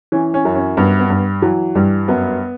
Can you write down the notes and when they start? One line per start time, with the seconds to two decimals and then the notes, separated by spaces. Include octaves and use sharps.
0.12 E3 C#4
0.34 C#4
0.45 F#2
0.55 C#4
0.77 G2 B3
1.00 B3
1.10 G2
1.42 E3 F#3
1.75 G2 G3
2.08 F#2 B3